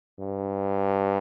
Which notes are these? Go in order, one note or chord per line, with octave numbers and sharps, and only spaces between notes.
G2